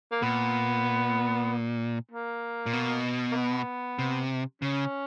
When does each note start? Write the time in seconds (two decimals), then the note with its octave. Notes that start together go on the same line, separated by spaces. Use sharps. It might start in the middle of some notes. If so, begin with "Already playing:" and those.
0.11 A#3
0.22 A#2 B3
2.11 A#3
2.66 A#2
2.73 B2
3.32 A#3
3.36 B3
3.99 C3
4.62 C#3 C#4